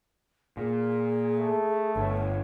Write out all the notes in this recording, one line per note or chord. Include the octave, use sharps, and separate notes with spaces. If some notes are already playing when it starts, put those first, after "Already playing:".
A#2 G#4
A3
G1 C#5